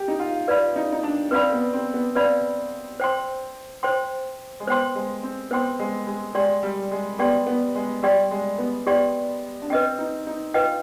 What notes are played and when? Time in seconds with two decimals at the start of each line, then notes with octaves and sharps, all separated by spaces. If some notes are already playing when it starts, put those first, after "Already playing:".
Already playing: G4
0.08 D#4
0.19 F4
0.47 F4 B4 D5 F5 B5
0.76 D#4
0.92 D#4
1.03 D4
1.31 C4 B4 D5 F5 B5
1.53 B3
1.73 C4
1.94 B3
2.15 C4 B4 D5 F5 B5
3.00 C5 G5 C6
3.83 C5 G5 C6
4.60 G#3
4.67 B3 C5 G5 C6
4.95 G#3
5.23 C4
5.51 B3 C5 G5 C6
5.79 G#3
6.07 G#3
6.35 G#3 G4 D5 G5 C6
6.63 G3
6.91 G#3
7.19 B3 G4 D5 G5 C6
7.47 B3
7.75 G#3
8.02 G3 G4 D5 G5 C6
8.31 G#3
8.58 B3
8.87 B3 G4 D5 G5 C6
9.62 D4
9.70 C4 B4 D#5 G5
9.99 D#4
10.27 D#4
10.54 F4 B4 D#5 G5